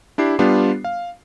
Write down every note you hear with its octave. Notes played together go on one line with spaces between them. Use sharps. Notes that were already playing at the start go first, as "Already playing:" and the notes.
D4 E4 G4 C7
G3 B3 D4 F4 G4
F5